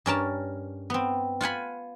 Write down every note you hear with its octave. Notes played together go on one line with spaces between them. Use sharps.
G2 C#4 A#4 A5
B3 C4
F4 F#5 G#5 B5